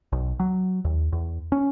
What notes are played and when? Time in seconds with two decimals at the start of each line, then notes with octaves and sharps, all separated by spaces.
0.12 B1
0.40 F#3
0.85 D#2
1.12 E2
1.52 C#4